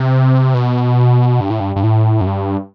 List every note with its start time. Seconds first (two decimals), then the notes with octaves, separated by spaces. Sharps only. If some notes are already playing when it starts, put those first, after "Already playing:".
Already playing: C3
0.54 B2
1.40 G2
1.50 A2
1.60 G2
1.76 G2
1.83 A2
2.21 F#2
2.26 G2